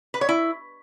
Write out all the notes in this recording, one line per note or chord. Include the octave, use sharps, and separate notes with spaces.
B4
C#5
E4